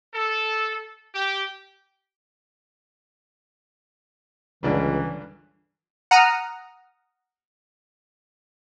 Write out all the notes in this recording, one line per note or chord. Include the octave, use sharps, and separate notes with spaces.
A4
G4
C#2 G2 A#2 D3 E3
F#5 A#5 D#6 F6